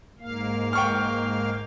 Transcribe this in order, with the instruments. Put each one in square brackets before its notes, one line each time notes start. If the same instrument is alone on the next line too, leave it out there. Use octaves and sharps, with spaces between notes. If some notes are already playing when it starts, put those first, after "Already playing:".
[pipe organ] G#2 A#3 F5
[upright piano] G5 C#6 F6